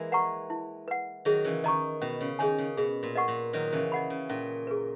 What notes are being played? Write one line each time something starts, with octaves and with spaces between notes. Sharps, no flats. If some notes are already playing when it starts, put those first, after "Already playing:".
Already playing: E3 G#3 A#3
B4 F#5 A#5 C#6
E4
B4 F#5
D#3 F#3 G#4
C#3 E3
D#3 D#5 A#5 C#6
B2 C#4
C#3
D#3 G#4 C#5 G#5
C#3
B2 G#4
A#2
B4 D#5 F#5 C#6
A#2
D#3 F#3 B4
C#3 E3
D#5 F#5 B5
C#3
A#2 C#4
G#4 B4